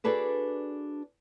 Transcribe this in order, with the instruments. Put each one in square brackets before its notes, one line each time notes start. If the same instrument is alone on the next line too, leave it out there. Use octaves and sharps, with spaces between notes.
[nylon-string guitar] D4 F#4 G#4 A4 B4 D5